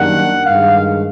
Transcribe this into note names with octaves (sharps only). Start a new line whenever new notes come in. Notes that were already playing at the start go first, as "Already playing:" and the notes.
Already playing: F#2 D#3 G3 A#3 D4 F#5
G2 D#3 G#3 F5